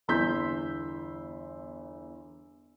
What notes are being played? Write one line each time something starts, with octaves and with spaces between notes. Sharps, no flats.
G1 E2 C6 E6 G6 B6